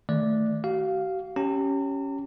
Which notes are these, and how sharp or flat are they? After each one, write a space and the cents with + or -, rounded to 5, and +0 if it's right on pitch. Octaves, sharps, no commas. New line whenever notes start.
D#3 +0 A3 +0 D5 +0
F#4 +45 F5 +0
C#4 +0 G4 -20 A#5 -45